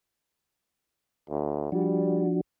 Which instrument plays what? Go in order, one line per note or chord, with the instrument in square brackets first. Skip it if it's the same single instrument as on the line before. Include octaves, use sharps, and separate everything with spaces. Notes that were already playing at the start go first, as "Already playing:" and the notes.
[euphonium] D2
[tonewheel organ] F3 D4 F#4 [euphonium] G3